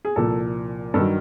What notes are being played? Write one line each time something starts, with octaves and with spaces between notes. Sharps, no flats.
G#4
C2 A#2 F3 A4
G2 D#3 F#3 A4